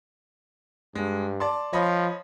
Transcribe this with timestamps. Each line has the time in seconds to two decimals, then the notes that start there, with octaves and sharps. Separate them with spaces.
0.95 G2 G#3
1.40 D5 A5 C6
1.73 F3 C#5 D#5 B5